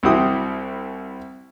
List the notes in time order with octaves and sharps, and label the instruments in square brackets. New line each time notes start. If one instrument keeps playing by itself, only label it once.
[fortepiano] C2 C4 E4 F#4 G4 D#6